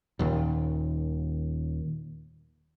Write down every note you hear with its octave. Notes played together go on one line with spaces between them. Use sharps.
D#1 D#2